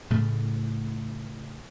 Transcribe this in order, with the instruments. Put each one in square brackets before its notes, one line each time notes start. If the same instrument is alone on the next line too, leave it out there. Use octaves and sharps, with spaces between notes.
[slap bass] A2 C#3 A3